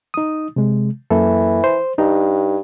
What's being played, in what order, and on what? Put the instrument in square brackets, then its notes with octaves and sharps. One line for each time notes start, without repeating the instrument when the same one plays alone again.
[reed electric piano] D#4 D#6
C3 G#3
[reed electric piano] F#2 A#3 A4 [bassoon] E3
[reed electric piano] C5
[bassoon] G2 [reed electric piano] D#4